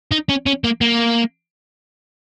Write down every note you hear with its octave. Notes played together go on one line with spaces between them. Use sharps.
D#4
C#4
C#4
A#3
A#3